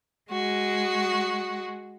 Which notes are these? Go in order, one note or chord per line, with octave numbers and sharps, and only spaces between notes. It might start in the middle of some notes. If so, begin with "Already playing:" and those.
G#3 F#4